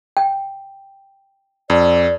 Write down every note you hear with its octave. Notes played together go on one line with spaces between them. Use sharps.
G5
F2 D5